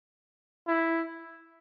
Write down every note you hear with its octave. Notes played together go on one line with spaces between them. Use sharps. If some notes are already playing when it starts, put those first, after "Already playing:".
E4